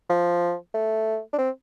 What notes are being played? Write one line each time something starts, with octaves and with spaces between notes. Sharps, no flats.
F3
A3
D4
C4